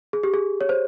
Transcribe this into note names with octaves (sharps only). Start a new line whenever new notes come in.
G#4
G4
G#4
C#5
C5